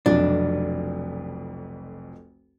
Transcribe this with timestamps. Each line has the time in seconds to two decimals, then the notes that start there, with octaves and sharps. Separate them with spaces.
0.06 F1 B1 F2 D4